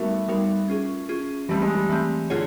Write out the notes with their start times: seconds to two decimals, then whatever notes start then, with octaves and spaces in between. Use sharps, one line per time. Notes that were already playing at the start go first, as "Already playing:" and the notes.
Already playing: G3 A3 B3 D#4 F#4 A#4
0.28 G3 B3 D#4 F#4 A#4
0.68 C#4 F4 G#4
1.09 C#4 F4 G#4
1.49 E3 G3 A3 C4
1.62 G#3
1.75 G3
1.89 E3 A3 C4
2.30 D3 F4 G#4 C#5